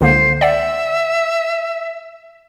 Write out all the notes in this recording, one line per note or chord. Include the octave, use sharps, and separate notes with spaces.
C#2 D3 A#3 C5
D5 E5 F#5